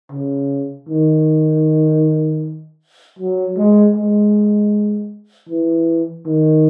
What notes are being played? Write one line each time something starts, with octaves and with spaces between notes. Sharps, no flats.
C#3
D#3
F#3
G#3
G#3
E3
D#3